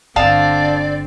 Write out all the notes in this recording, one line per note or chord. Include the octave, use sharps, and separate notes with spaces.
G1 D3 C4 D5 F5 A5 D#6